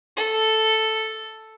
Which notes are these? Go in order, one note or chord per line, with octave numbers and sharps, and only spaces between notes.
A4